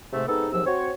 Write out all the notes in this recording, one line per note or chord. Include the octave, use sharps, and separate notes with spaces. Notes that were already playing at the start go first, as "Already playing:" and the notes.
G#2 C3 A3
C3 G#3 B3 D#4 A4
D#2 G#2 C3 F3 F#3 E6
C4 F#4 C5 C#5